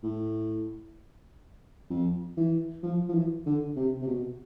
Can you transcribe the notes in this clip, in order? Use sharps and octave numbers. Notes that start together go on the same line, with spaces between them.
A2
F2
E3
F3
F3
E3
D3
C3
C3
B2